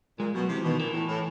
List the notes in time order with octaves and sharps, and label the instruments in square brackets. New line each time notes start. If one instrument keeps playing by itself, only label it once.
[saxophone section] A#2 [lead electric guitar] G#3
[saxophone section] B2 [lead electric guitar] F#3
[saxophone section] C3 [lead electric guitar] E3
[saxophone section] B2 [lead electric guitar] D#3
[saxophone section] A#2 [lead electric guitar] E3
[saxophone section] A2
A2